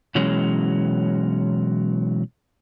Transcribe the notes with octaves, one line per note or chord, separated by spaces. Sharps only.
B2 E3 F#3 G#3 C#4